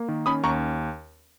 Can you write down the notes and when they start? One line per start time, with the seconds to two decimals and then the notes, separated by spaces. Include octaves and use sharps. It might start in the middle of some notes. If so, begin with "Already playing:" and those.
Already playing: A#3
0.08 D#3
0.26 C#4 B5 D#6
0.43 D#2 A#5 C#6